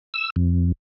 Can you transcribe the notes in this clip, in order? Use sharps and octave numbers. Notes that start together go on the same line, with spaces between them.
E6
F2